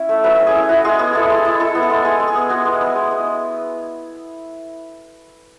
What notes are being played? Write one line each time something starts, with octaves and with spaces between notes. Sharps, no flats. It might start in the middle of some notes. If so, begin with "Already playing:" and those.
Already playing: C#4 E4
A3
F#3 B4
C#4
G#4
E4
E4 F#4
G#3 G#4
B3 G#4
E4 A4
G#3
E4
E4 A4
B3
A4
G#3
G#3 G#4
G#3
G#4
B3
B3 F#4
G#3
B3
G#3
G#3